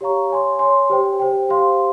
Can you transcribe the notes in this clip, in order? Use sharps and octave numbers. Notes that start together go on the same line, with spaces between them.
G4 C#5 F5 A#5 C#6
C#5 G#5 C6
C#5 G#5 C6
G4 C5 G5
G4 C5 G5
G4 C5 F5 C6